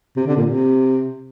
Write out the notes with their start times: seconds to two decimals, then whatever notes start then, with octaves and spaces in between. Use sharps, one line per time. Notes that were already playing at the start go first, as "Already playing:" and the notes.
0.16 C3
0.26 D3
0.36 A#2
0.46 C3